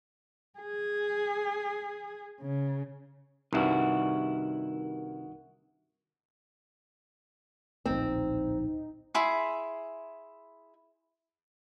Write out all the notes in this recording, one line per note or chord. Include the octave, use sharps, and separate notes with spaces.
G#4
C#3
C2 G2 D#3 E4 F#4
D1 A#1 C4 D#4
E4 G#4 C6